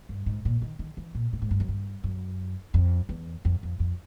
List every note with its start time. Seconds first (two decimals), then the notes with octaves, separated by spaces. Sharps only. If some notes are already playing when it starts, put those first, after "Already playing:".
0.09 G2
0.26 G#2
0.45 A#2
0.62 D#3
0.79 D#3
0.97 E3
1.15 A#2
1.33 A2
1.42 G#2
1.51 G2
1.60 F#2
1.68 G2
2.04 F#2
2.74 F2
3.09 E2
3.45 F2
3.63 F2
3.80 F2